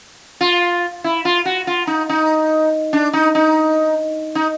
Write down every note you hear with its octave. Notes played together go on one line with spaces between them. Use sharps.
F4
E4
F4
F#4
F4
D#4
D#4
D4
D#4
D#4
D#4